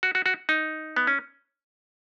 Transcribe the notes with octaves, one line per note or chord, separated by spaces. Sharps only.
F#4
F#4
F#4
D#4
B3
C#4